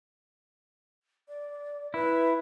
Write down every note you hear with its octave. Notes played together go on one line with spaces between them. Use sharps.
D5
E4 B4